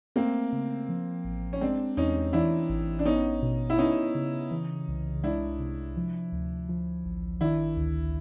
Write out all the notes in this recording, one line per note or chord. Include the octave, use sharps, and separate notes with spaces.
A3 A#3 C4
C#3
F3
A1
C#4
G#3 C4 D4
E2 C#4 D#4
E3 D4 E4
A1
D4
B3 C#4 D#4
B2
E4
B3 C#4 D#4
C#3
E3
C2
G#3 D4 E4
C3
F3
D2
F3
A1
D#3 D4 E4
D2